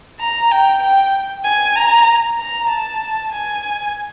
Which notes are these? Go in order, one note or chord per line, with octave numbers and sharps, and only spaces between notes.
A#5
G5
G5
G#5
A#5
A#5
A5
G#5